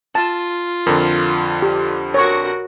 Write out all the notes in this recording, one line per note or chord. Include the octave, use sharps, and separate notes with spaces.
F4 A5
F2 D3 A#4
G4
F#4 A#4 C#5 C#6